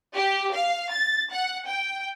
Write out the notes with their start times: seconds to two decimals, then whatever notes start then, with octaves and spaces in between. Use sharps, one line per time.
0.15 G4
0.54 F5
0.91 A6
1.33 F#5
1.68 G5